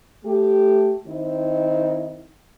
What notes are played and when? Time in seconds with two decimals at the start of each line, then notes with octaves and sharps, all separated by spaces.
0.24 A3 G4
1.06 D#3 C4 D#4 E4